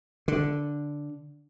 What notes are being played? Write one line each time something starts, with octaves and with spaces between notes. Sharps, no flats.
D3